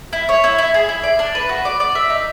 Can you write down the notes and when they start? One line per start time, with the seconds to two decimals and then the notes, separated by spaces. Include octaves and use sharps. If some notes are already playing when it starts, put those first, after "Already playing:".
0.13 E4
0.29 C#5
0.44 E4
0.58 E4
0.74 G#4
0.89 E4
1.03 D5
1.19 D4
1.35 B4
1.49 F#4
1.65 D5
1.80 D5
1.95 E5
2.10 D#4